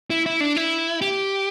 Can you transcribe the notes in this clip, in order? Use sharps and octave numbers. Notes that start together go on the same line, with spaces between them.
E4
E4
D4
E4
G4